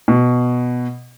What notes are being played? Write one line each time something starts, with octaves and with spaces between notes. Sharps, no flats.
B2